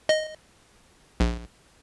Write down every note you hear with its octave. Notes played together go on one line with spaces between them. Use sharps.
D#5
A#1